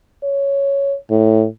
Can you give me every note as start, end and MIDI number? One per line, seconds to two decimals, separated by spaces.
0.23 0.96 73
1.11 1.45 45